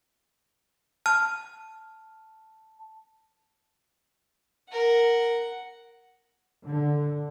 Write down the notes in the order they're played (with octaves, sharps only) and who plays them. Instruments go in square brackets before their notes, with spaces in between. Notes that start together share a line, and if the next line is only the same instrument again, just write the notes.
[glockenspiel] A5 [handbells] F6
[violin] A#4 [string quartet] F#5
[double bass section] D3